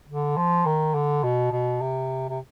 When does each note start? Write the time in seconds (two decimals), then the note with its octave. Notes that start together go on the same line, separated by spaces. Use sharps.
0.08 D3
0.37 F3
0.66 D#3
0.95 D3
1.23 B2
1.52 B2
1.81 C3
2.30 C3